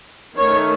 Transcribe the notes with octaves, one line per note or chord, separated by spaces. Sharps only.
D#3 A3 C#4 C#5